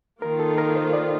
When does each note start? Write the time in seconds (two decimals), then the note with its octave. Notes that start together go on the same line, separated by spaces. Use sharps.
0.22 D#3 A#3 F4 A#4
0.40 A4
0.58 A#4
0.76 C5
0.93 D5